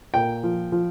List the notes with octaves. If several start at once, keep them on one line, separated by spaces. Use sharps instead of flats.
A#2 G5
F3
F3